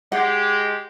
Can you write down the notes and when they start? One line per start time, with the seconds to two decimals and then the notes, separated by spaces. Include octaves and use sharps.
0.12 G#3 G4 F#5